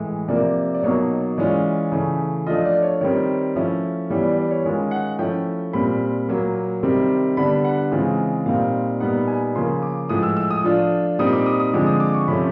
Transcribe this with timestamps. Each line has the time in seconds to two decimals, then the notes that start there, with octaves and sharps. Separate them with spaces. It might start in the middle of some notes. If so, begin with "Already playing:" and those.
Already playing: A2 E3 G#3
0.28 C3 F3 A#3 D5
0.75 D5
0.83 B2 F#3 A#3 D#4 C#5
1.38 E3 G#3 C#4 F4 D5
1.92 C#3 E3 A3
2.47 F3 A3 D4 F4 D#5
2.65 D5
2.83 C#5
3.01 D#3 G3 C4 C#5
3.56 F3 A3 C#4 E4
4.10 E3 G3 B3 E4 C#5
4.24 D5
4.37 D5
4.51 C#5
4.65 D#3 G#3 C#4 F4 C#5
4.91 F#5
5.19 F3 A3 C#4 E4 G5
5.73 A#2 G3 C4 B5
6.29 A#2 F#3 A#3
6.83 C3 D#3 G3 C4
7.37 D3 G3 B3 D4 B5
7.65 F#5
7.78 F#5
7.92 C#3 E3 G#3 C4 F4
8.46 A#2 G3 C4 D#4 F5
9.00 A#2 G3 B3 D#4 F#5
9.28 G#5
9.55 C#3 F3 A#3 C6
9.83 D6
10.09 A2 F3 G#3 D#6
10.23 E6
10.37 E6
10.50 D#6
10.64 F3 A3 D4 F4
11.19 A#2 G3 C4 D#4 D#6
11.33 D6
11.46 D#6
11.60 D#6
11.73 D3 F3 G#3 C4 D6
11.87 D#6
12.00 D6
12.14 C#6
12.28 C3 F3 A3 C#4 B5